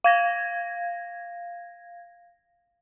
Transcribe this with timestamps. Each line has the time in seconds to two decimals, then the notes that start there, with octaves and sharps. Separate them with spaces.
0.04 F5 G#6 A#6